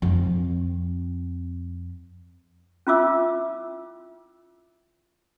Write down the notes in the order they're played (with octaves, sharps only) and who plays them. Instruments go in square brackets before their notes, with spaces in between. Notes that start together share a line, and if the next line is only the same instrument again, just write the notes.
[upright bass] F2 C4
[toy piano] C#4 E4 F4 E5 D6 E6